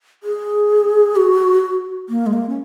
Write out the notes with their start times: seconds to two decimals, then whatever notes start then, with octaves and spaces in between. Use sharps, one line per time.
0.24 G#4
1.16 F#4
2.09 A#3
2.26 G#3
2.33 A#3
2.49 C#4